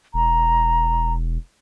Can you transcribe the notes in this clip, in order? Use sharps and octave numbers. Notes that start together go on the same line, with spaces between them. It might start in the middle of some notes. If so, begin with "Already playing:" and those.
E1 A#5